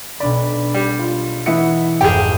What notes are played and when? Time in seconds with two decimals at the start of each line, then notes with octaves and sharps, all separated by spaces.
0.20 B1 D4 D5 B5
0.74 G3
0.99 F4
1.46 E3 D#5 E5 F#5 C#7
2.01 G#1 F2 G4 G#4